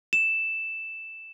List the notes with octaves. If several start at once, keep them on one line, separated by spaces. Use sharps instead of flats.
E7